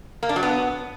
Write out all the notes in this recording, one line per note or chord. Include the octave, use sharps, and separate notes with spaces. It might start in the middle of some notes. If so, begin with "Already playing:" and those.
A#3
D4
F#3
B3